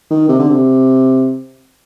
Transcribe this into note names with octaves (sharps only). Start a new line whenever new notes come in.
D#3
C3
D3
C3